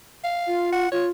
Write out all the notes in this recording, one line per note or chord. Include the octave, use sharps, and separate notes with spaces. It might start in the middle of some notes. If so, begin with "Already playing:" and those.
F5
F4
F#5
F4 C#5